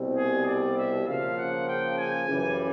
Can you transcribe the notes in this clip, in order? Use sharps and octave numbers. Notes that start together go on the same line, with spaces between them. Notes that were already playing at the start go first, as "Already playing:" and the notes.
Already playing: C2 B2 G3 C4
G#4
D5
E5
C#3 F3 A#3 F5
F#5
G5
G#5
F#2 C#3 E3 G3